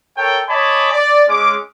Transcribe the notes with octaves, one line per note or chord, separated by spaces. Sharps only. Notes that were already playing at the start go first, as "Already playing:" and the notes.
A4 A#4 C#5 G5
C#5 D#5 G#5 A5 B5 D6
D5
G#3 C#4 D6